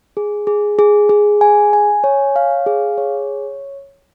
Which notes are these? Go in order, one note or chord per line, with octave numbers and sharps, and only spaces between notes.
G#4
G#4
G#4
G#4
G#5
G#5
C#5
F5
G#4
C#5